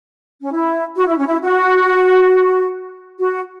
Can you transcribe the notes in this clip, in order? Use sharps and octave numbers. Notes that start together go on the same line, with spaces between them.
C#4
E4
F#4
E4
C#4
E4
F#4
F#4